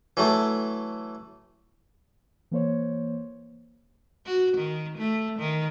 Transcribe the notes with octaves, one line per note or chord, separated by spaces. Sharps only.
E3 F#3 A3
E3 A#3 C5 C#5
F#4
D#3
A3
D#3